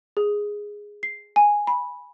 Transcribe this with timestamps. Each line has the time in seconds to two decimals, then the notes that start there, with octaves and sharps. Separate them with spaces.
0.17 G#4
1.03 C7
1.36 G#5
1.67 B5